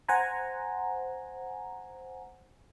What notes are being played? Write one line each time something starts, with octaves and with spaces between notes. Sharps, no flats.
C5 F#5 G#5 A#5